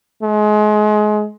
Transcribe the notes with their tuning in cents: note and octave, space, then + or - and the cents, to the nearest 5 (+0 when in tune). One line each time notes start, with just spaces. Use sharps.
G#3 +30